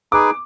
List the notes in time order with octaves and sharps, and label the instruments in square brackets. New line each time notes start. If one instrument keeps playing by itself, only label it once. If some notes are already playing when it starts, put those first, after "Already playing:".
[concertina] D#4 G#4 B4 [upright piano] D6